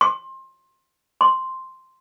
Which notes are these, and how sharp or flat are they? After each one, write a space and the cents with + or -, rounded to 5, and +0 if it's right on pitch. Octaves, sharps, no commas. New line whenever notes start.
C6 +25
C6 +0